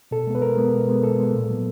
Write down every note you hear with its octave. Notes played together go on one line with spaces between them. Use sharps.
B2 A4
G#3 B3
B4
B2 A#4
G#3 B3
B2
G#3 B3
B2 A4
G#3 B3
A#2
F#3 B3